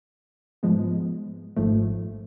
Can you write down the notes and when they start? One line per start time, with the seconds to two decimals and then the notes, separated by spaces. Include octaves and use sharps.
0.63 G#2 F3 G#3 B3
1.57 G#1 G#2 F3 A3